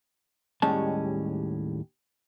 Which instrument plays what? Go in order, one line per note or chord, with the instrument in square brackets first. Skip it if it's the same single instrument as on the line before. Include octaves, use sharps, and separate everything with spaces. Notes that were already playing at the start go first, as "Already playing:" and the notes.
[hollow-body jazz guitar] D#2 A2 G3 G#3 C#4 A5